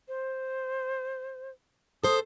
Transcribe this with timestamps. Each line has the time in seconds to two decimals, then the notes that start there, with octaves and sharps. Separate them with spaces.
0.08 C5
2.04 A4 C5 D#6